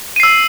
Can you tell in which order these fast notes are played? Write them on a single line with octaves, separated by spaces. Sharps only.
D#7 C7 E6